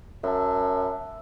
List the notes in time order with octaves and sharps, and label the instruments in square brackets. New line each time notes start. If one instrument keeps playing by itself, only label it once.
[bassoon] F#2 [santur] E5 A5